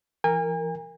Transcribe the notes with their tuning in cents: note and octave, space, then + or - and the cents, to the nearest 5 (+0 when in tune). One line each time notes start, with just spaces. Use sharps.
E3 +40 A#4 -10 G#5 -40